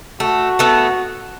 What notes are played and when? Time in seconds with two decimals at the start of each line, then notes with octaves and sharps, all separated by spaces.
0.20 A3 F#4
0.59 A3 B3